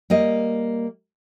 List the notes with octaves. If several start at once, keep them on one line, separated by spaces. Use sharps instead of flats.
G3 A#3 D#5